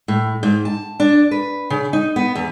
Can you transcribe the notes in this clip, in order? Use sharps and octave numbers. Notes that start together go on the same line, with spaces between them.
A2
G#2
A5
D4
B4
C#3
D#4
B3
E2